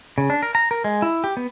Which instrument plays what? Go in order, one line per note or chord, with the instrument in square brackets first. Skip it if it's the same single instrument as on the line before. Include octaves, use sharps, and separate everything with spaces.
[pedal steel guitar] C#3
D4
A#4
A#5
A#4
G#3
E4
G4
B3